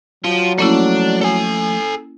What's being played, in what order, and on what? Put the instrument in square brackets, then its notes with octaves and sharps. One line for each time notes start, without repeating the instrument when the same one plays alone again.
[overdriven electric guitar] F3 [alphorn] F#3
[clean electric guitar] F3 A3 [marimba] A#3 C#4 E4 [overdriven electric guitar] D4
[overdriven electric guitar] A4 G#5